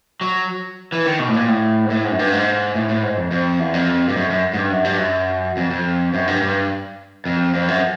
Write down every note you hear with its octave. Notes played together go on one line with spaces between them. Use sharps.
F#3
E3
D#3
B2
A2
A#2
A2
G#2
A2
G#2
F#2
G2
G#2
A2
A2
G#2
F2
F2
E2
F2
G2
F#2
F#2
G#2
G2
F#2
G2
F#2
F2
F2
F#2
G2
G2
F2
F2
F#2